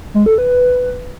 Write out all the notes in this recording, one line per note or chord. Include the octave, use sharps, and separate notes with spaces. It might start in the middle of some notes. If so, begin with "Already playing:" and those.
G#3
A4
B4